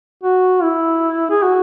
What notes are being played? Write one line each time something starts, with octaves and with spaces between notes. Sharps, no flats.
F#4
E4
G#4
F#4